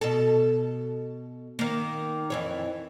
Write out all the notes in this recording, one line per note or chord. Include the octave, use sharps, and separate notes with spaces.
B2 A4
D#3 A#3
F2 E3 C#5